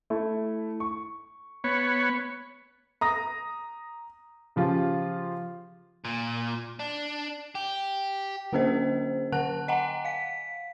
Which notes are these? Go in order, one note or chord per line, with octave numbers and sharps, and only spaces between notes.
A3 E4
C#6
B3 C#5
A#5 D#6 A#6
C#3 F3 F4 G4
A#2
D4
G4
D3 A#3 C#4 G#4 C5 D#5
D3 F#5 A5 F#6
D#5 F#5 G#5 A#5
F5 B6